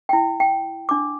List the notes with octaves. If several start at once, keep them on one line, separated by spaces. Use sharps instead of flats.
E4 G5
G5
D4 D6